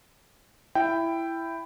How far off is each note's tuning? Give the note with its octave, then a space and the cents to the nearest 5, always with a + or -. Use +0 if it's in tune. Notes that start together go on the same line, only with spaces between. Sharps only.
E4 +10 G5 +0